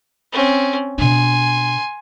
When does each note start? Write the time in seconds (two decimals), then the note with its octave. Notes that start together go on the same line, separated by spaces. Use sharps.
0.32 C4 C#4
0.98 B2 D4 G#5 C6